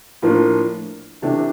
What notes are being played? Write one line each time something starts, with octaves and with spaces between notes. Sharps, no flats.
A2 F3 A#3 D4 F4
C3 E3 A3 D4